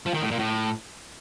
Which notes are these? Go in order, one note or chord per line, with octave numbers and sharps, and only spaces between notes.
F3
D#3
A2
A#2
A2